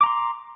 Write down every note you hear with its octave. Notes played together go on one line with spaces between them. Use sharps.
A#5 C6 D6